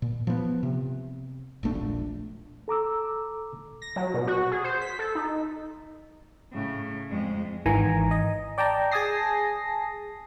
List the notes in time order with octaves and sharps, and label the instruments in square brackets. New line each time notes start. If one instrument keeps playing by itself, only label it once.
[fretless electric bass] A#2
F3 B3
C3
E1 A#1 A3 D4
[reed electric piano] A4 A#5 D6 E6
[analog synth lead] A#6
F#3
B2
F#4
G#4
C5
B6
A4
D#4
[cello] A2 C#3
F2 G#3
[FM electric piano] G#1 D#3 E3 G#5 A#5
D#5
D5 G5 A5 A#5
G#4 G#5 A5 D#6 A#6 C7